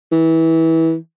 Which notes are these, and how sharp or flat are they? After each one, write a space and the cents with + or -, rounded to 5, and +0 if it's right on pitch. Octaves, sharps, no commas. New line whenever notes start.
E3 -20